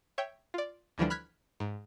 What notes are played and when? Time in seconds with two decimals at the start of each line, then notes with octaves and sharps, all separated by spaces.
0.18 C#5 E5 G5
0.54 F4 D5
0.98 D2 D3 E3 F3 G3 D4
1.10 B5 F6 F#6 G#6 B6
1.60 G#2